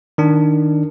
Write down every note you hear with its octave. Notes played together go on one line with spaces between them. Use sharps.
D#3 D4